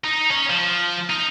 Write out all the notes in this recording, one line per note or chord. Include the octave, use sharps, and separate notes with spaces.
D#4
C#4
F3
D#4